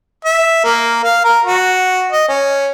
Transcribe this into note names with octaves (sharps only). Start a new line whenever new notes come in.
E5
A#3
F5
A#4
F#4
D#5
C#4